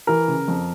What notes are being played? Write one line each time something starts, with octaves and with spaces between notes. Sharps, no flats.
E3 A#4
C#3
F2